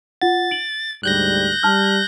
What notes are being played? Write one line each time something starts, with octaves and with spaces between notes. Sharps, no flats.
F4 F#5 A6
D7 F#7
D2 G#2 G3 F#6 G6 A#6
G3 A5 F6